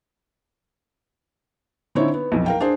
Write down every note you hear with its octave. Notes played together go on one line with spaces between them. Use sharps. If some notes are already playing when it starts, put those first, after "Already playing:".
D3 C4 D#4 E4 C#5
B3
B1 F2
A#4 F5 G5
D4 G#4 C5